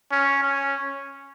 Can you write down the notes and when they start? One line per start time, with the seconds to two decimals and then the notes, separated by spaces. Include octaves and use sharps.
0.11 C#4
0.42 C#4